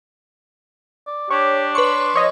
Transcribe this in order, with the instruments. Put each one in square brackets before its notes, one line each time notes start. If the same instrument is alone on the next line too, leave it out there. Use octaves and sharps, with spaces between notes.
[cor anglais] D5
[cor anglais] D4 [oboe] G4 [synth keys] C#5
[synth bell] B4 C#6 [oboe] C6
[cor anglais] F3 [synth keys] C#5 D#5